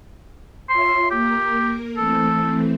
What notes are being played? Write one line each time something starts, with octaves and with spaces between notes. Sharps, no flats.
F4 C#5 E5 C6
A#3 G4 A#4
E3 A3 C4 A4